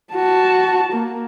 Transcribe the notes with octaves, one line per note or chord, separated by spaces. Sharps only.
F#4 A5
A#3